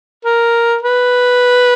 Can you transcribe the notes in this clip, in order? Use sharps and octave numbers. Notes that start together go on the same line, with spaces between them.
A#4
B4